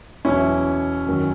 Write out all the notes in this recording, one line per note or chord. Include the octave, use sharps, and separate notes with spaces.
E2 B2 F#3 C#4 E4
F#2 D#3 F#3